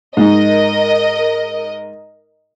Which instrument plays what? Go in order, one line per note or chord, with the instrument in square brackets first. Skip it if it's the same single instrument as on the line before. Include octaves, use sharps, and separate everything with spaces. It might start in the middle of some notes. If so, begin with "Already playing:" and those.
[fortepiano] G#2 D#4 [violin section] A#4 D#5